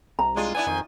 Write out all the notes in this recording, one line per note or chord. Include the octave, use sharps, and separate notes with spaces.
C2 A#5
G#3 D4 F4
B3 D4 E4 G#5
F2 D#3